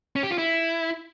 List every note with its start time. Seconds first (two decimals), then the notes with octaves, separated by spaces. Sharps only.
0.16 C#4
0.23 G4
0.31 F4
0.38 E4